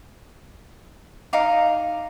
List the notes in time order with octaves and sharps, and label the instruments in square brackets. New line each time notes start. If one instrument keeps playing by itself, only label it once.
[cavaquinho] D#4 D#5 F5 D6